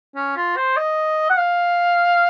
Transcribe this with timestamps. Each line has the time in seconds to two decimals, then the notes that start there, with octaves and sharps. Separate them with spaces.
0.16 C#4
0.37 F4
0.57 C5
0.77 D#5
1.30 F#5
1.38 F5